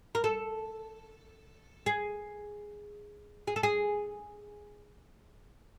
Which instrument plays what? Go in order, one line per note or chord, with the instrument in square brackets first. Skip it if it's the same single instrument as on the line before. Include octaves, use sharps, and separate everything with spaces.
[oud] A#4
A4
G#4
G#4
A4
G#4